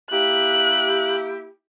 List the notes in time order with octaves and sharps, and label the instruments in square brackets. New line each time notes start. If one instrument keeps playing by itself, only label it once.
[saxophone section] A#3 E4 G4 [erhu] F#6